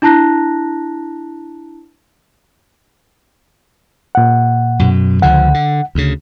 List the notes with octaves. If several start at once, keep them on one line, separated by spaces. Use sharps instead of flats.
D4 E4 A5 A#5 F#6 A#6
A#2 F#5
F#2 B2
C#2 D3 F3 F#5
D3
D2 C#3